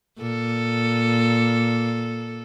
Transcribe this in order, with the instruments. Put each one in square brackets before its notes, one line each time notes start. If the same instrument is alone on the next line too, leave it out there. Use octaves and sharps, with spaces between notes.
[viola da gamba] A#2 A4